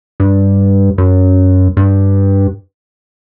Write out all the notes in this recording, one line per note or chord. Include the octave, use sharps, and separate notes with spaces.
G2
F#2
G2